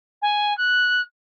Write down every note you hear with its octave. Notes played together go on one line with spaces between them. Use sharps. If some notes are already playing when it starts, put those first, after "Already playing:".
G#5
F#6